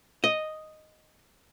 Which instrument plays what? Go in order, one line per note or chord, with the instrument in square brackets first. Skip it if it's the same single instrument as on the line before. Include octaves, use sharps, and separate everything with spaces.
[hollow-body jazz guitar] D#5